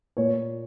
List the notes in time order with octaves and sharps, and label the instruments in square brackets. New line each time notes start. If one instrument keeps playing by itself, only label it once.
[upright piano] A#2 C#5